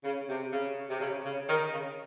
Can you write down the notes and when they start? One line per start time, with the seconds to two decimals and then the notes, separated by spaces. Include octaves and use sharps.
0.04 C#3
0.29 C3
0.52 C#3
0.89 C3
1.00 C#3
1.24 C#3
1.49 D#3
1.73 C#3